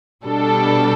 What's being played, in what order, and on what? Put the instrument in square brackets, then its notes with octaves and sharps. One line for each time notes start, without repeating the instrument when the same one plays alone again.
[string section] B2 G3 D4 A4